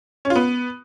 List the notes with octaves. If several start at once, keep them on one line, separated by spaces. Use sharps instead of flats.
C#4
F4
B3